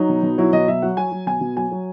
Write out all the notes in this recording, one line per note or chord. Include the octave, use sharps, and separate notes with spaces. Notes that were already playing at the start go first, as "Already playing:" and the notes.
Already playing: F#3 D#4
B2
B2
F#3 E4
B2 D#5
F#3 E5
F#3 F#5
F#3 G#5
F#3
B2 G#5
B2
F#3 G#5
F#3